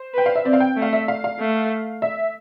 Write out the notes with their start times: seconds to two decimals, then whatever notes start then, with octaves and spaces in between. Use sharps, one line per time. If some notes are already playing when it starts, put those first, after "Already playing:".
Already playing: C5
0.14 B4 G5
0.26 F5
0.35 E5
0.45 C4 D5
0.53 F5
0.60 G5
0.76 A3
0.82 F5
0.93 E5
1.08 F5
1.24 F5
1.39 A3
2.02 E5